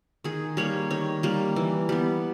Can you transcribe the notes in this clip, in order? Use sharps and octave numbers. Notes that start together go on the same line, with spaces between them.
D#3 G#4
G3 A#3 C#5
D#3 C#5
G3 A#3
E3
G3 B3